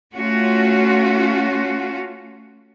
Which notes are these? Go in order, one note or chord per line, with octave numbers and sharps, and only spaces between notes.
A3 C#4 F4 F#4